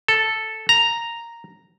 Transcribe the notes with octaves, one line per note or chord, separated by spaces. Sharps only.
A4
A#5